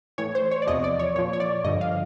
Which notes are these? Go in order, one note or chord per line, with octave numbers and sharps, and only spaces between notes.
A2 E3 C#5
C5
C#5
D5
E2 C3 F3 D#5
D5
C#5
A#2 F3 C#5
C#5
D5
G2 D3 F3 D#5
F5